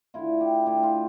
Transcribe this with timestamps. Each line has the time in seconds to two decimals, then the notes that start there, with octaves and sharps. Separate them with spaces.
0.14 D3 A3 E4 F4
0.41 G4
0.66 D3 A3 E4 G4
0.83 F4